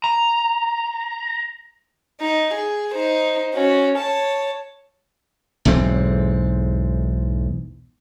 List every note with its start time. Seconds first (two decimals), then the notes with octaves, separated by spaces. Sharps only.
0.04 A#5
2.20 D#4
2.54 G#4
2.94 D#4 C5
3.54 C#4 F#4
3.97 C#5 A5
5.65 B1 E2 G#2 C4